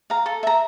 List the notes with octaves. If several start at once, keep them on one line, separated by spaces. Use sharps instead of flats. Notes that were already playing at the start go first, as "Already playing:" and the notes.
F5 A#5
A4
E5 A#5